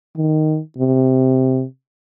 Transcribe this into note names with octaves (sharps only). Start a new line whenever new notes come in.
D#3
C3